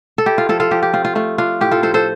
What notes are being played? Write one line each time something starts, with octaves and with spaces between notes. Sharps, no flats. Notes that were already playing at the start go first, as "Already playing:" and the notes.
A4
E4 G4
F4
F3 F4 A4
F4 A4
F3 G4
G4
C4 F4
F4
A3 F4
D4 F4
A2 G4
F4 A4
F3 A4 C5
A4 C5